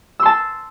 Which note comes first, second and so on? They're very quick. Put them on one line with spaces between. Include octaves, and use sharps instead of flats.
E6 C6 A5